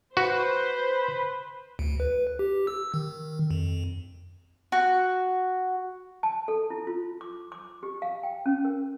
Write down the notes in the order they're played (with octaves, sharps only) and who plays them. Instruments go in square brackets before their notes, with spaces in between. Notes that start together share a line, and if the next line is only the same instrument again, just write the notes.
[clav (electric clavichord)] F#4 [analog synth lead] B4 [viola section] C5
[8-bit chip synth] D2
B4
G4
E6
D#3
F2
[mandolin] F#4
[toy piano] A5
A4
E4
F4
D6
D6
G4
F5
G5
C#4
A#4